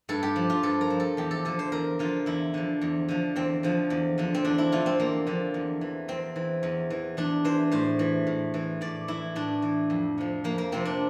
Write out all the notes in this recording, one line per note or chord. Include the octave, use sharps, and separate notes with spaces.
G2 A4
G4
F3
F4
G2 A4
A#4
F3
A4
E2 G4
A4
D3 F3 A4
C5
E2 A#4
D3 F3 F4
E2 E4
D3 F3
E2
D3 F3
E2 C4
D3 F3
E2
D3 F3
C4
E2 D4
E4
D3 F3 F4
C4
E2 A#3
D3 F3
E2
E3
E2 C4
E3
E2
E3
E2 D4
E3 C5
A2 C5
E3
A2
E3
A2 D5
E3 E4
A2 D4
E3
F2
C3 F3
F2 A#3
A#3
C3 F3 C4
D4